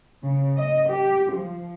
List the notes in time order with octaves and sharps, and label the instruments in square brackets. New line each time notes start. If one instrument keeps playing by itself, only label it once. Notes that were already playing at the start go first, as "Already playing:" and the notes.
[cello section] C#3
D#5
G4
F3